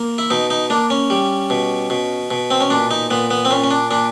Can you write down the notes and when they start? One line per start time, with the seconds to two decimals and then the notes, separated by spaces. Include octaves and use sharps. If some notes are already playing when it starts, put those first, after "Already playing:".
Already playing: A#3
0.18 E4
0.30 B2 D#4
0.50 D#4
0.70 A#3 D4
0.90 C#4
1.10 G3
1.50 B2
1.90 B2
2.31 B2
2.51 C4
2.60 C#4
2.70 A#2 D4
2.91 D#4
3.11 A#2 B3
3.31 B3
3.45 C4
3.51 A#2 C#4
3.64 C#4
3.71 D4
3.91 A#2 D4